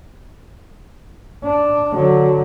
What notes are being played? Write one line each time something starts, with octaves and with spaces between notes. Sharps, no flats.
D4
D3 F#3